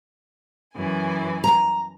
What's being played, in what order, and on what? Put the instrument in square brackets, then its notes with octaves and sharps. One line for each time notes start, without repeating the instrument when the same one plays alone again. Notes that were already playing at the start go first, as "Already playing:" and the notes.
[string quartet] F#2 E3 G#5
[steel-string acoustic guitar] A#5